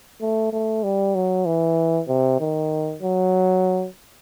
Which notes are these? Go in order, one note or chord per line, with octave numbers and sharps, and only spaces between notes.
A3
A3
G3
F#3
E3
C3
D#3
F#3